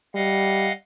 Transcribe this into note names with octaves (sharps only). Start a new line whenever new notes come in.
G3 D#5 F5 F#5